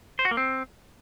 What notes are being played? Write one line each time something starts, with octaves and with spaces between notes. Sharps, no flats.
C5
F#4
A#3
C4